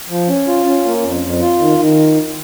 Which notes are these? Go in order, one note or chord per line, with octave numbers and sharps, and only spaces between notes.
F3
C#4
F4
C#4
A#3
F2
F2
F4
D#3
D#3